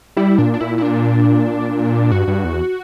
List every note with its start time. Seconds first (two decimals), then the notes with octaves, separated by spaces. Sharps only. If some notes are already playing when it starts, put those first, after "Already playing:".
0.17 G3 E4
0.38 A#2 D4
0.54 D4
0.61 A#2 E4
0.78 E4
0.82 D4
2.12 G2 F#4
2.28 G2
2.44 E2